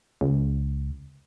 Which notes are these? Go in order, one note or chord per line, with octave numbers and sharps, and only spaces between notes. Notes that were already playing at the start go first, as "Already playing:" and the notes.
C#2